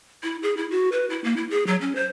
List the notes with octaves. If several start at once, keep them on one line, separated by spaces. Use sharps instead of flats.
E4
G#4
E4
F#4
B4
E4
A#3
E4
G#4
F#3
C#4
C5